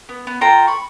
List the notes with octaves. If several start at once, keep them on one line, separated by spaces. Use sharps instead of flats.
B3
B3
F4 A4 G5 A#5
B5 C#6